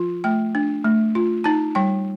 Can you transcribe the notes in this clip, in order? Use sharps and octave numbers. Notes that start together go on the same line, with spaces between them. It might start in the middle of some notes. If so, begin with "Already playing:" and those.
Already playing: F3 F4
A3 G5
D4
A3
F4
D#4 A5
G3 G5